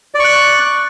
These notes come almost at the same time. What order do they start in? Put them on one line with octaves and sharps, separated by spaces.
D5 C#6 F#6